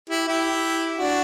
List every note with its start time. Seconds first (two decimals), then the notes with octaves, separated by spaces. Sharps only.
0.10 E4 G4
0.28 E4 G4
0.98 D4 F#4